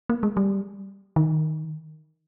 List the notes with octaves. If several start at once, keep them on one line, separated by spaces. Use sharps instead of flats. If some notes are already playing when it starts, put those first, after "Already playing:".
A#3
G#3
G3
D#3